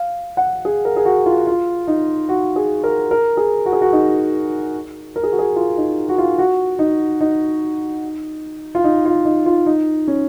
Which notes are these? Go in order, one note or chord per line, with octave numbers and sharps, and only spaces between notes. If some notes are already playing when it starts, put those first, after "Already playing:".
Already playing: F5
F#5
G#4
A#4
G#4
F#4
F4
F4
D#4
F#4
G#4
A#4
A#4
G#4
F#4
G#4
F#4
D#4
A#4
G#4
F#4
G#4
F4
D#4
F#4
F4
F#4
D#4
D#4
F4
D#4
F4
D#4
F4
D#4
C#4